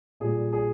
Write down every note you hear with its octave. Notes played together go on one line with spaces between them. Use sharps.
A#2 G3 G#4
G#4